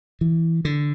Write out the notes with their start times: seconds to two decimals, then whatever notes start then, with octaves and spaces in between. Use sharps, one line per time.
0.21 E3
0.65 D3